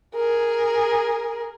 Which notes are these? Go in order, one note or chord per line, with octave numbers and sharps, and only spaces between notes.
G#4 A#4